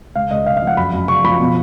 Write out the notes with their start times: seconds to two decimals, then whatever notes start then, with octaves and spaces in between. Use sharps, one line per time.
0.15 C#2 F5
0.31 C#2 D#5
0.46 C#3 F5
0.57 F5
0.62 F3
0.67 F#5
0.77 F#2 B5
0.93 F#2
1.08 C#3 C#6
1.24 F3 B5
1.39 B2